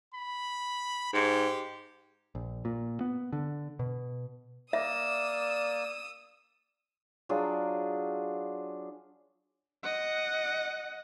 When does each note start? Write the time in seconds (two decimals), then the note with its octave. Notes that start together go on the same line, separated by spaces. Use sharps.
0.14 B5
1.13 G#2 G4
2.35 A#1
2.65 A#2
3.01 B3
3.32 D3
3.79 B2
4.73 A#3 D5 E5 D#6 E6
7.29 F#3 D4 F4 G#4
9.83 D#5 F#5